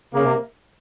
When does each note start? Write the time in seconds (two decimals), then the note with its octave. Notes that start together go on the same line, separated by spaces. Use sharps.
0.13 C#3 A#3
0.23 C3